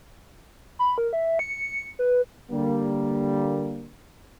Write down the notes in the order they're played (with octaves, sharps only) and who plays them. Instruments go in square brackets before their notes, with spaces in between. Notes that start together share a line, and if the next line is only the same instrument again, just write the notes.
[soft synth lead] B5
A#4
E5
C#7
B4
[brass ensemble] D3 G3 A#3